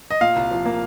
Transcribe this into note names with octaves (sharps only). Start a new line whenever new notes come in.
D#5
A#2 F5
C2
F3
A#3